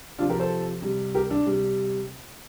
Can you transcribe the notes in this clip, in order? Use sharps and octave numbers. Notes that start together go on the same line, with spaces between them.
C3 F3 D4 F4
G4 A#4
A4 C5
C3 G3
G4 A#4
D4
C3 G3